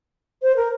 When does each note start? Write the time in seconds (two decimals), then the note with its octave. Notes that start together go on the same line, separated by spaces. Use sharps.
0.43 C5
0.57 A#4